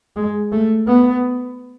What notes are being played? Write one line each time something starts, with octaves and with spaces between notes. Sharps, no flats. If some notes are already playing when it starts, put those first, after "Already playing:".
G#3
A3
B3